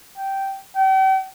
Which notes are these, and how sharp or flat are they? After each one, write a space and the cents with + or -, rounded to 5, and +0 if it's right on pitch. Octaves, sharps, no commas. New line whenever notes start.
G5 -10
G5 -40